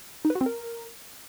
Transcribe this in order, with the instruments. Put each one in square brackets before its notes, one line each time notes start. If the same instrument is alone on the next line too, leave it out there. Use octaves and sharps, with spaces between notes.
[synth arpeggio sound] D#4
B4
F#4
C4
A#4